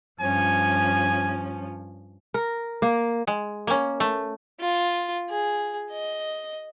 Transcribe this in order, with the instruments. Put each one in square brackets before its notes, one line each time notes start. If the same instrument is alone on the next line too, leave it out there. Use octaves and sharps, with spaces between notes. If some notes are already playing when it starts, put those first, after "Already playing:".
[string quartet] G2 F3 C#4 [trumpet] G#5
[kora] A#4
A#3
[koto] G#3
A#3 C#4
A3
[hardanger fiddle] F4
G#4
D#5